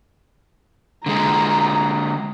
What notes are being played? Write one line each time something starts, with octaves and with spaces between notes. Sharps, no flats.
D3 G#3 A#5